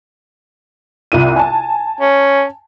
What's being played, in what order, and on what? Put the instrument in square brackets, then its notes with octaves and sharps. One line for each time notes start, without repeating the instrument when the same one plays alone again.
[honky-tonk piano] C2 F4 D#7
G#5 A5
[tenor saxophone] C#4